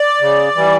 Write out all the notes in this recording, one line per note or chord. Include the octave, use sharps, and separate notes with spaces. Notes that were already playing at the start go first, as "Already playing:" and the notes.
Already playing: D5
C#3
E3 G3